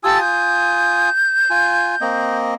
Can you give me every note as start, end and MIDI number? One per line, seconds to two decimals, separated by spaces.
0.03 1.10 65
0.03 0.18 67
0.03 1.10 80
0.03 0.18 81
0.03 1.10 87
0.03 0.18 88
0.22 2.35 91
1.50 1.95 65
1.50 1.95 80
2.01 2.54 58
2.01 2.54 60
2.01 2.54 75